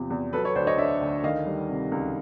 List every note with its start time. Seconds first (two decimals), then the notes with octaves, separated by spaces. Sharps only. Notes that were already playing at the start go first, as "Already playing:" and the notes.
Already playing: E2 C3 F3
0.10 E2
0.33 F#3 A4 B4
0.44 B4 C#5
0.55 D2 C5 D5
0.67 C#5 D#5
0.78 D3 D5 E5
1.01 D2
1.23 D#3 D#5 F5
1.46 G3
1.69 C3
1.92 C#2